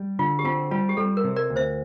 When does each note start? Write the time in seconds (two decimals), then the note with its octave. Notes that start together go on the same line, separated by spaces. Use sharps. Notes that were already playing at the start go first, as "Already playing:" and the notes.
Already playing: G3
0.19 D3 F4
0.39 G4
0.45 C4 F4
0.71 G3 F4
0.89 G4
0.97 G3 A4
1.17 A#4
1.24 C3
1.36 A#4 D5
1.50 D2
1.56 C5 E5